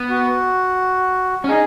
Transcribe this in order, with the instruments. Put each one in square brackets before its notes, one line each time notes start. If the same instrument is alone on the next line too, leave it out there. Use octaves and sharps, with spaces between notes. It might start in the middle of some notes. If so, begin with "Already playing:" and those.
Already playing: [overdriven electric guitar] B3
[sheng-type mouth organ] F#4
[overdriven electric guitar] C#4
[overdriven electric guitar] D#4 [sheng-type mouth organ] G#4